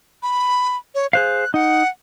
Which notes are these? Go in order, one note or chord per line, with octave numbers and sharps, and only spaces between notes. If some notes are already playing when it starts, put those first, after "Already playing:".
B5
C#5
G#4 C5 F5 F#6
D#4 F#5